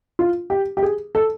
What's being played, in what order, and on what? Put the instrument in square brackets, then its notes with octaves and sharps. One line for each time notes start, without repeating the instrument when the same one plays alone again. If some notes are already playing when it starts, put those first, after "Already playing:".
[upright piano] F4
G4
G4
G#4
A4